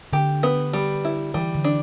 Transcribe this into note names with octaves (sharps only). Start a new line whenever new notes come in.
D3 G4
B3
G3
E4
E3 G3
D3
D4